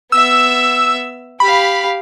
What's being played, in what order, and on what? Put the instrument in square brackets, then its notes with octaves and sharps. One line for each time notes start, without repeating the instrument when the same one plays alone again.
[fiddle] B3 E5 [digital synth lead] E6
[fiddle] G4 F5 [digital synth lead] B5